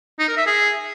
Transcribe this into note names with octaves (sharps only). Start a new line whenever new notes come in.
D#4
A#4
E5
G#4